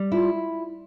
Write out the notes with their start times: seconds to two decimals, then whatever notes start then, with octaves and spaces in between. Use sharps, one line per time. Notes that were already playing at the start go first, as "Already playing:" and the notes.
Already playing: G3
0.12 E4 F4